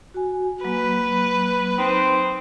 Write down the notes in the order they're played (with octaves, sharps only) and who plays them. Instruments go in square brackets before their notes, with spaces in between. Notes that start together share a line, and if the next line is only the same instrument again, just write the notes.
[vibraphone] F#4 G#5
[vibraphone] F#3 A#3 [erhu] B4
[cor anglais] C4 [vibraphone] D#4